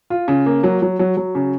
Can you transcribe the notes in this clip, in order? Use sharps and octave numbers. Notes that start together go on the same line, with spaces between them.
F4
C#3
A#3
F#3
F#3
F#3
F#3
C#3